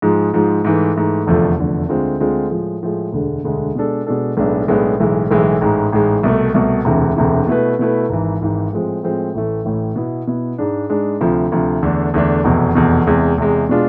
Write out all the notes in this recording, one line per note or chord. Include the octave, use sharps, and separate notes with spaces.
G#2 F3 G#3
G#2 F3 G#3
G#2 E3 A3
G#2 E3 A3
F1 E2 D3 F3 A3
F1 E2 D3 F3 A3
D2 D3 G#3 C4 F4
D2 D3 G#3 C4 F4
A2 F3 G#3
A2 F3 G#3
E1 D2 D3 G#3
E1 D2 D3 G#3
B2 G#3 D4 A4
B2 G#3 D4 A4
B1 A2 G#3 B3 D4
B1 A2 G#3 B3 D4
B1 A2 E3 G#3
B1 A2 E3 G#3
A1 G#2 G#3
A1 G#2 G#3
C2 B2 A3
C2 B2 A3
E1 D2 C3 E3
E1 D2 C3 E3
B2 A3 E4 B4
B2 A3 E4 B4
G#1 G#2 E3
G#1 G#2 E3
A2 F3 G#3 C4
A2 F3 G#3 C4
A1 A2 E3 A3
A1 A2 E3 A3
B2 B3 E4
B2 B3 E4
G#2 G#3 D4
G#2 G#3 D4
D2 C3 F3
D2 C3 F3
E2 D3 A3 D4
E2 D3 A3 D4
F1 E2 B2
F1 E2 B2
E2 C3 G#3
E2 C3 G#3
B2 G#3 D4 F4